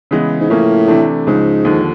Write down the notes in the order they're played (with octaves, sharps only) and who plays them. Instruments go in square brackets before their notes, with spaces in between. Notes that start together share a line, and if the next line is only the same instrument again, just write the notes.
[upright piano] C#3 E3 G#3 B3
[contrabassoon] G#2
[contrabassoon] A2 [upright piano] C#3 F3 A#3 C#4
[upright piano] C3 E3 A3 D4
[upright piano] C#2 C#3 F3 [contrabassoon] G#2
[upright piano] D#2 D3 F3